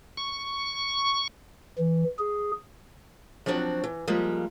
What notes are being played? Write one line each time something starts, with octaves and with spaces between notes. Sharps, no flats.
C#6
E3
G#4
F3 F#3 C4 D4 F#4
E3
F3 G3 G#3 A#3